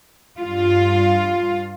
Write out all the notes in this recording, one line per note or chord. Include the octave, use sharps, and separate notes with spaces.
G2 F4